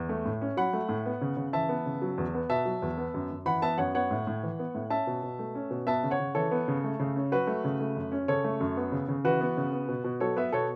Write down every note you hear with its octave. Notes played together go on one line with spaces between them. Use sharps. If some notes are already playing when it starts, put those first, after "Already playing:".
Already playing: E2
A3
A2
C#4
F#3 F#5 B5
A3
A2
B3
C#3
C#3
E3 E5 A5
B3
C#3
F#3
E2
B3
B2 E5 A5
F#3
E2
B3
F#2
F#2
E3 F#5 B5
B3 E5 A5
F#2 C#5 F#5
B3 C#5 F#5
A2
A2
E3
B3
A2
C#4 E5 A5
B2
B2
A3
C#4
B2
B3 E5 A5
C#3
C#5 F#5
C#3
E3 A4 C#5
B3
C#3
A3
C#3
C#4
F#3 F#4 B4
A3
C#3
A3
F#2
C#4
C#3 A4 C#5
A3
F#2
B3
C#3
C#3
E3 F#4 B4
B3
C#3
B3
B2
B2
F#3 A4 C#5
B3 B4 E5
B2 A4 C#5